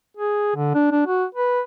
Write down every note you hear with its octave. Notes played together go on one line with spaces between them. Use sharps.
G#4
D3
D4
D4
F#4
B4